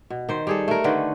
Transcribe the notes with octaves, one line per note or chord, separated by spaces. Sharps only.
B2
D#3 C5
G3 G#4 A4
A3 A#4
D3 D#3 B4